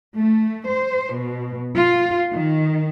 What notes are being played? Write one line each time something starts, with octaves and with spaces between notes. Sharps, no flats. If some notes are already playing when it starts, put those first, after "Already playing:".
A3
C5
B2
F4
D#3